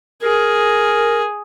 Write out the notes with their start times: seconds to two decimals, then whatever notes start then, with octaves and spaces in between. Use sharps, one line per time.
0.23 G#4 A#4